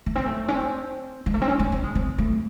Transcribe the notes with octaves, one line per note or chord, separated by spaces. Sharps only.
A3
C4
A3
C#4
C4
G#3
A3
C4
C#4
C#4
C4
G#3
C4
A3